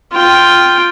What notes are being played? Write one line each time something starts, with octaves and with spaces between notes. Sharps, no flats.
F4 G5